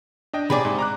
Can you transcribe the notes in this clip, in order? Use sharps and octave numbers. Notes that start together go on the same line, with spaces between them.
D4 D#5 G5
C3 G#4 D5 B5
G#2
A#5 D6 F#6